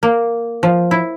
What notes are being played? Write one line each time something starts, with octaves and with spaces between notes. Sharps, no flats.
A#3
F3
E4